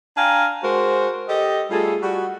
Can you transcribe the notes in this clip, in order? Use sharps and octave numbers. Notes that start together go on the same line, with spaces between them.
D4 F5 G5 G#5 A#5
G#3 F#4 A#4 C5
G4 A4 D#5
G3 A3 F4 G#4 A4
G3 F#4